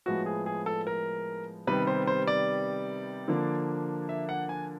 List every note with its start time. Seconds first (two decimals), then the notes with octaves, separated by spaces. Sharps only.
0.06 A2 F3 G#3 B3 F#4
0.26 G#4
0.46 G#4
0.66 A4
0.87 A#4
1.67 C3 D#3 G3 B3 B4
1.87 C5
2.07 C5
2.27 D5
3.28 D3 F3 A#3 D4
4.09 E5
4.29 F#5
4.49 G#5